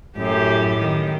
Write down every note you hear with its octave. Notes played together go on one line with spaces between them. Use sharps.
F#2 A2 G4
D#3